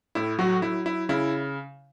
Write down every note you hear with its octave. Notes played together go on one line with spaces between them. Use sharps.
A2 E4
F#3 F#4
F#3 E4
E4
C#3 E4